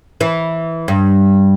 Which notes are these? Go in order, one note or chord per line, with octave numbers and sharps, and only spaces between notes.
E3
G2